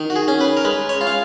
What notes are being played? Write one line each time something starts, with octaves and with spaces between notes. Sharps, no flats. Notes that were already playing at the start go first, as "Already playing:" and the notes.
Already playing: D#3
F#4
G#4
C#4
B4
A#4
G#3 B4
C#5
F4
F5